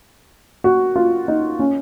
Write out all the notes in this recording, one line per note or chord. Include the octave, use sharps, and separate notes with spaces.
F#4
F4
D#4
C#4